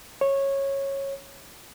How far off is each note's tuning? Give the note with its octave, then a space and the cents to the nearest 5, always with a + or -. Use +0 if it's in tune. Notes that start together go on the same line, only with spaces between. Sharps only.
C#5 -15